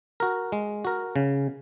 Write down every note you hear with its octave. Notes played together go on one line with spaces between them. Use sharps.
F#4 A#4
G#3
F#4 A#4
C#3